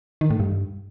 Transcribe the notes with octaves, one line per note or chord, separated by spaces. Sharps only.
D#3
A2
G2